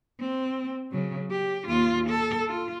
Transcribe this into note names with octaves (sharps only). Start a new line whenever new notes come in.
C4
C#3 F#3
G4
D#2 F4
A4
F4